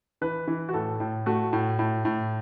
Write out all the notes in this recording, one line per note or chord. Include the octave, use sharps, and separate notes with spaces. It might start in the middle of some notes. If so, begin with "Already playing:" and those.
E3 B4
E3
F#4
A2 A4
A2
A3 F#4
A2
A2
A2